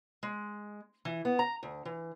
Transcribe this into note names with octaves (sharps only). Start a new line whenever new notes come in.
G#3
E3
B3
A#5
D2
E3